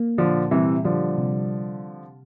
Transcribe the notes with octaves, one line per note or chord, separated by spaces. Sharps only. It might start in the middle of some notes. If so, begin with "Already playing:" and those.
Already playing: A#3
A#2 D3 F3
C3 E3 G3
D3 F3 G3
C3